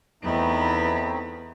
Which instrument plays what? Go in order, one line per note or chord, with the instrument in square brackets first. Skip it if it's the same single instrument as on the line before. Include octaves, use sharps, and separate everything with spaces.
[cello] E2 B3 [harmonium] A3 C4 D#4